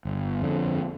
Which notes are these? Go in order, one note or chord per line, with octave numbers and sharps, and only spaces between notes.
G1
F2 D3